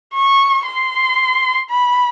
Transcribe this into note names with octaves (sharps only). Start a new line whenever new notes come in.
C#6
C6
B5